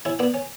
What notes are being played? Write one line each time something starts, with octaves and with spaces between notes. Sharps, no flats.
C#4 E4
B3 D4
C#4